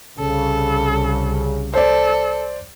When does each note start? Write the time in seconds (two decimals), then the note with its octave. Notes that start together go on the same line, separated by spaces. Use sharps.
0.19 C2 C#3 A4
1.74 A4 C5 D5